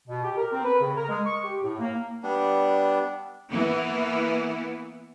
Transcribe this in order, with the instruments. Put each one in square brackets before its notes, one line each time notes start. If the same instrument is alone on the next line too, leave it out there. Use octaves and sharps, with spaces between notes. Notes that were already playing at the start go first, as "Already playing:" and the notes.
[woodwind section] B2
G4
A#4
C4
B4
C#3
A#4
G#3
C#6
G4
A2
A#3
[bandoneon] G3 B3 D4
[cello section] E3 A#3 B3 E4